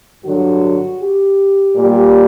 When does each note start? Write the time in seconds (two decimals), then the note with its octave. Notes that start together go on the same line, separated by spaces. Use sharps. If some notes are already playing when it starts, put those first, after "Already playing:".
0.24 G2 D3 F#3 F#4
1.00 G4
1.76 A#2 G3